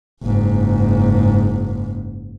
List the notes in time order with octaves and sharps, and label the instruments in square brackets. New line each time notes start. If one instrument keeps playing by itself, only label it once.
[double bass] F#1 G#2